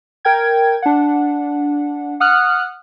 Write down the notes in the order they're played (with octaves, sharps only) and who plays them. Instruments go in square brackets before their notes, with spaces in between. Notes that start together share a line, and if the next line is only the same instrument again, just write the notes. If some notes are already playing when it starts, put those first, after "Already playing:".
[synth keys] A#4 G5 G#6
D4 F#5
F#5 D#6 F6 F#6